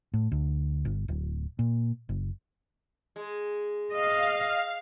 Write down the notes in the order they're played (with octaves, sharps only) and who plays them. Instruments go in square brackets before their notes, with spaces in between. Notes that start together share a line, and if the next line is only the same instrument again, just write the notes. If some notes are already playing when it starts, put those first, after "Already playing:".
[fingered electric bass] A2
D2
G1
D1
A#2
F#1
[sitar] G#3
[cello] D#5 [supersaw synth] F5